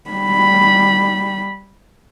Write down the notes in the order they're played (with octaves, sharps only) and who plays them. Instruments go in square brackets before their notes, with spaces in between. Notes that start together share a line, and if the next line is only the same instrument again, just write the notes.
[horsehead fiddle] G3 B5